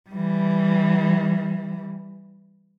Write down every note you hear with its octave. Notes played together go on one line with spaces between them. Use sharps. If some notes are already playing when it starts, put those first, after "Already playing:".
E3 G3